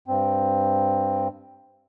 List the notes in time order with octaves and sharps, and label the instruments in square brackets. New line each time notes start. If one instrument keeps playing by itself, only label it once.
[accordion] G2 C4